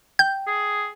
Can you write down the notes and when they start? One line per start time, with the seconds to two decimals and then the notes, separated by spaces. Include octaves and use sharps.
0.19 G5 G6
0.47 G#4